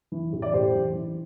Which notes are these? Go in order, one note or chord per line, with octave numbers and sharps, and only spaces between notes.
E3
A1
D5
A2 G4 C5
A1
E3